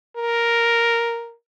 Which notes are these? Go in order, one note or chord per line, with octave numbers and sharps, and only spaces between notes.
A#4